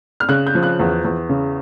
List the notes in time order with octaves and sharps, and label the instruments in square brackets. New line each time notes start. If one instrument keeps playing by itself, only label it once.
[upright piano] F6
C#3 F#6
G6
F3
F#6
E2
E2
C#3